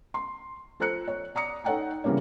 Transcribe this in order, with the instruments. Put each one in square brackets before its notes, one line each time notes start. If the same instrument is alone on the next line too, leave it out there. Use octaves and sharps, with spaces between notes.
[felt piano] C6
F3 A4 C5 A#5 F#6 C#7
C#5
D5 A#5 D#6 C#7
D#4 A4 C#5 F#5 G5 A#5
C#3 E3 G3 A#3 D4 C#5